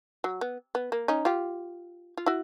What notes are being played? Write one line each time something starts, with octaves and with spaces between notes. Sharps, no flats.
F#3
B3
B3
A#3
C#4 D#4
F4 G4
F4
E4 F#4